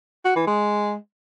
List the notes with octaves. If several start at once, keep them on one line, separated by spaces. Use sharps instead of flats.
F#4
E3
G#3